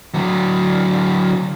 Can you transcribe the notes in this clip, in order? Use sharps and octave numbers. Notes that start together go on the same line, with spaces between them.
D3 F#3